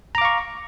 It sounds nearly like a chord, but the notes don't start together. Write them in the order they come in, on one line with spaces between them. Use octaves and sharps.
A#5 D6 F5 C#6